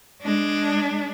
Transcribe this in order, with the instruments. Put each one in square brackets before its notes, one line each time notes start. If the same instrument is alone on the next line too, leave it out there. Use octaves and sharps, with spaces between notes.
[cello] G#3 D4